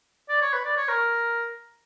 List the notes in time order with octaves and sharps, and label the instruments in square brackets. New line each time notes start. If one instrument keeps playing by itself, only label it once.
[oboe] D5
C#5
B4
D5
C#5
A#4